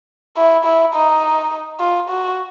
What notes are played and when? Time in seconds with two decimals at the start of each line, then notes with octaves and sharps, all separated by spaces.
0.37 E4
0.65 E4
0.94 D#4
1.80 F4
2.10 F#4